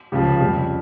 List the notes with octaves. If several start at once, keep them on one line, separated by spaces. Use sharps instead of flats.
C#2 C#3 F3 G4
F2 C#3 G3